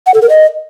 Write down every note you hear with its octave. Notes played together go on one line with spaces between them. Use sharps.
F#5
A4
A#4
D#5